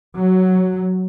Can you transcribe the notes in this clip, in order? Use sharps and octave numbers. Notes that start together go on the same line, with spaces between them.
F#3